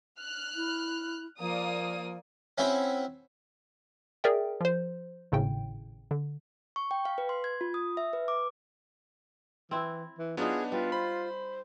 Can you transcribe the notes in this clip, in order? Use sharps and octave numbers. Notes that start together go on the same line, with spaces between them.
F6 F#6
E4
F3 A#3 D5 D#6
C4 C#4 E4 F#4 C5
G#4 A#4 D5 E5 G5
F3 C5
G#1 A2 C#3 G5
D3
C#6
G5
F5
B4
C6
G#6
F4
D#6
E5
B4
D6
E3 C4 E4
E3
F#3 B3 D4 D#4 F4 G#4
G3 F4 B4
C5 B5